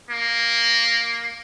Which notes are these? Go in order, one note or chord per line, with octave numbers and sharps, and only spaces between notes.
A#3